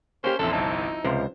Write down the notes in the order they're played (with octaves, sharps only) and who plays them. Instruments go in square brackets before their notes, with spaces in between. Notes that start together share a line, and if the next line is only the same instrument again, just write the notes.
[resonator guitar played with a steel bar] A#3 G4 [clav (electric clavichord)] C#4 [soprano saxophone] C5
[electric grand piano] A#1 E2 [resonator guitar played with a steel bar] F3 C4 E4 [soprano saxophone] A4
[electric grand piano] G1 C2 A5 [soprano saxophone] D#4
[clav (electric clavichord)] C#2 [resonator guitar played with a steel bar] C3 F3 G3 [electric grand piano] C5